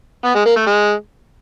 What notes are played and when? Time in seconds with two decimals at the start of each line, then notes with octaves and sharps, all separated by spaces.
0.25 B3
0.35 G#3
0.46 A#3
0.56 A3
0.66 G#3